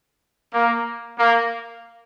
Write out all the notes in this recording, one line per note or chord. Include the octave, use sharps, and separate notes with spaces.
A#3
A#3